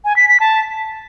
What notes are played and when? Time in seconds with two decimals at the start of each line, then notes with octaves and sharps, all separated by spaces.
0.05 G#5
0.16 B6
0.28 B6
0.40 A5